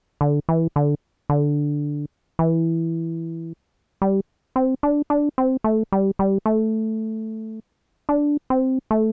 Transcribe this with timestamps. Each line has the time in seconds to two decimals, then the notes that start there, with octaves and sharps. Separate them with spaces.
0.21 D3
0.49 E3
0.76 D3
1.30 D3
2.39 E3
4.02 G3
4.56 C4
4.83 D4
5.10 D4
5.38 C4
5.64 A3
5.92 G3
6.19 G3
6.46 A3
8.09 D4
8.50 C4
8.91 A3